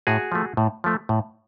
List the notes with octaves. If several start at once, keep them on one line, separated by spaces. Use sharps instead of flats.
A2 F#4 G#4
F3 A3
A2
F3 A3
A2